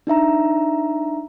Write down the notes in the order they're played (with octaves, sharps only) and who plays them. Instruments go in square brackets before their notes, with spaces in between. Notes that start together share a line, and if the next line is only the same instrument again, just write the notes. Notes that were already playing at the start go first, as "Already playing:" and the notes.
[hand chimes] D4 D#4 E5 A#5